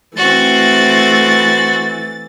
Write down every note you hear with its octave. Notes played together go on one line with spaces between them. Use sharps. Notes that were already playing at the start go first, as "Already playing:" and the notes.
E3 A3 C4 F#4 A6